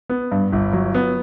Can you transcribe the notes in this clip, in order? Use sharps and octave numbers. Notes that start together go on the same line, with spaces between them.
B3
G2
G1
F#3
B3